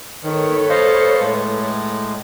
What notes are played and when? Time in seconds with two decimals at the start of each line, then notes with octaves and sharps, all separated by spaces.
0.24 D#3 A4 B4 C#5
0.69 C5 D#5 F5
1.20 A2 G#3